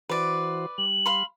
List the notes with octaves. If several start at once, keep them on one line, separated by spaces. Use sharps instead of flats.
E3 F#4 B4 C5 D5
G3 F#7
F5 B5 C6